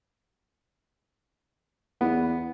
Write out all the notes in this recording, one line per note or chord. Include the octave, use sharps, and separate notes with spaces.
E2 B3